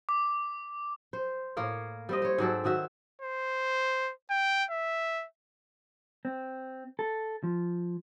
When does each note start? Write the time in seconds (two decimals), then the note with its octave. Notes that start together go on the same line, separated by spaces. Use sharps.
0.09 D6
1.13 C5
1.57 A2 A#3 C#5 F5
2.09 G3 C4 D#5
2.22 C5 C#5
2.38 G#2 F#3 C4 A4
2.64 D#3 F#3 F#4 E5
3.22 C5
4.31 G5
4.70 E5
6.25 C4
6.99 A4
7.44 F3